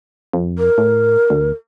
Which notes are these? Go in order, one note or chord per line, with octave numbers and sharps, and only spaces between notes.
F2
A#4
A2
D2